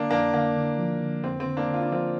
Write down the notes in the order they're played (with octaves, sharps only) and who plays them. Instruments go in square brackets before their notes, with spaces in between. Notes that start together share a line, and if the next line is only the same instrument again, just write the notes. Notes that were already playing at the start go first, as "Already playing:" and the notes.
Already playing: [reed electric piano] D3 [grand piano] A#3 D4
[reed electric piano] F2 [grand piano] A#3 D4
[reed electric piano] D3 [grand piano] A#3
[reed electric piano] D3
F3
D3
[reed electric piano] F2 [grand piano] C4
[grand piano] C4
[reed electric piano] D3
[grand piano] A#3 D4
[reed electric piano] D3
[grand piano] F4
D4
[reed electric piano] F3 [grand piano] C4 F4